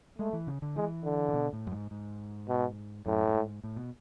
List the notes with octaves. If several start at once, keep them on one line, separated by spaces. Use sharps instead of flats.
G#3 A3
E3
C#3
D3
E3 G#3
D3
C#3
B2
A2
F#2
G#2
G#2
B2
F#2 A2
F#2
G#2
A2
B2